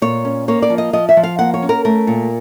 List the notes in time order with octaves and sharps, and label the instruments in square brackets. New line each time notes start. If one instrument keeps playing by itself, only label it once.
[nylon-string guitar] A#2 C#5
C#4
A#3 C#5
D5
F3
D#5
F3 D#5
E5
F3
F5
A#3 F#5
C#5
C#4
A#4
A3 A#4
A#2